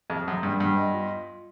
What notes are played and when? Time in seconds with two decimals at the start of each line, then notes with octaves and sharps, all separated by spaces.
0.10 F2 G#4
0.27 F#2 G#4
0.43 G2 D4
0.60 G2 B3
0.78 D#5
0.94 F4